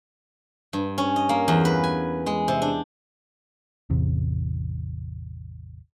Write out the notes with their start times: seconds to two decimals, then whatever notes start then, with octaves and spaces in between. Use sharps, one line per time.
0.73 G2
0.98 C#4
1.16 D#5
1.29 A#3
1.48 E2
1.65 B4
1.84 G#5
2.26 G#3
2.48 C3
2.62 D4
3.90 A1 E2 C3